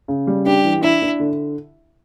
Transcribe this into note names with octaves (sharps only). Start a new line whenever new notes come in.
C#3
G3
D4 G4
E3
D4 E4
D4
D3